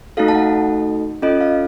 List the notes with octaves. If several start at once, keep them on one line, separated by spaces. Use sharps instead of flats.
A3 D#4 F#4 A4 F5
A5
F#5
C#4 F4 A4 D#5
F5